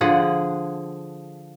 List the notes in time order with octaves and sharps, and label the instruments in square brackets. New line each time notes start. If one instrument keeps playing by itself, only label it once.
[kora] D3 F3 G#4 F#5